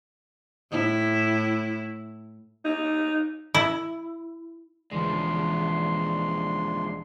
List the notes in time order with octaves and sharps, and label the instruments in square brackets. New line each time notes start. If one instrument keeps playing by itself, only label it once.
[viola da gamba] A2 E4
[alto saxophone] D#4
[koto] E4
[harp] E1 E3 G3 [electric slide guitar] F3 G#3 [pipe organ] D4 C6